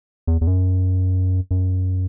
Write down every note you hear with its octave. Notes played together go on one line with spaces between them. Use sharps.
E2
E2
F#2
F#2